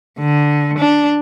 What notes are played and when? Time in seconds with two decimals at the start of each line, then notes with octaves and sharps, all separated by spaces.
0.19 D3
0.79 D4